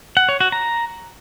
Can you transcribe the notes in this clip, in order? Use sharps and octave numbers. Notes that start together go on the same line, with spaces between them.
F#5
C#5
F#4
A#5